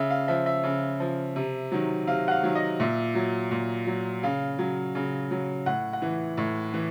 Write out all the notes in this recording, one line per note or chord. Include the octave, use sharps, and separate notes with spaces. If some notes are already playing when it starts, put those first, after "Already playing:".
Already playing: C#3 E5
F5
F3 E5
E5
C#3
F3
C3
D#3 F#3
C3 F5
F#5
F5
D#3 F#3
D#5
A#2 E5
F#3
A#2
F#3
C#3 F5
F#3
C#3
F#3
A2 F#5
F#5
E3
A2
E3